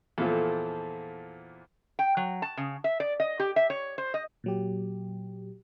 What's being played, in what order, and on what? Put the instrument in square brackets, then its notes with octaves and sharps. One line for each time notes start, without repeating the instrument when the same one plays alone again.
[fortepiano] E2 A#2 F3 [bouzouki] A4
[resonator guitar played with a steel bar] G5
F#3
A5
C#3
E5
D5
D#5
G4
E5
C#5
C5
D#5
[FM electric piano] A#2 F#3 G4